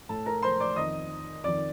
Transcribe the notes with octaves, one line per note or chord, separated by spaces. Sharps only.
A2 A4 A5
A#4 A#5
C5 C6
D5 D6
F2 D#3 D#5 D#6
F2 D#3 D5 D6